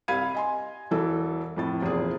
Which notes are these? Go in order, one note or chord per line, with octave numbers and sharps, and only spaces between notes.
C2 C3 F5 B5 G#6 D#7
D#5 G#5 C6
E1 E3 A4
F2 A2 A6
F1 E2 A#2 G#4